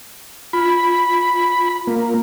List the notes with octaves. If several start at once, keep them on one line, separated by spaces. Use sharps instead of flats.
F4 B5
A#3